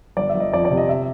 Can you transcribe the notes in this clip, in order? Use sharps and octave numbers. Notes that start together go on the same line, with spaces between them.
G1 D5
E5
G1
D#5
F2 D5
D5
C3
D#5
E5